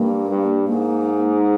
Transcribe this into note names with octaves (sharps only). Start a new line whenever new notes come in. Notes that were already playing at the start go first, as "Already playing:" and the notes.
Already playing: G2 A#3
G2
G#2 A#3